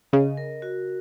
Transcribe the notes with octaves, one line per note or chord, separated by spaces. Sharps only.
C#3 D#5
A#4
F#4